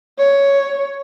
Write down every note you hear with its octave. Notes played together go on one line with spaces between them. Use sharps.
C#5